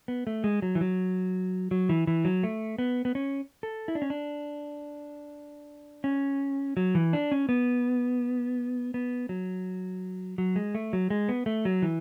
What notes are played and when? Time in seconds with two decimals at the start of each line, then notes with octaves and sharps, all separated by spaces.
0.08 B3
0.27 A3
0.44 G#3
0.62 F#3
0.75 E3
0.81 F#3
1.71 F#3
1.89 E3
2.07 E3
2.25 F#3
2.43 A3
2.78 B3
3.05 B3
3.15 C#4
3.63 A4
3.88 E4
3.95 D4
4.02 C#4
4.10 D4
6.04 C#4
6.77 F#3
6.95 E3
7.13 D4
7.32 C#4
7.49 B3
8.94 B3
9.29 F#3
10.38 F#3
10.56 G#3
10.75 A3
10.93 F#3
11.10 G#3
11.29 B3
11.46 A3
11.65 F#3
11.82 E3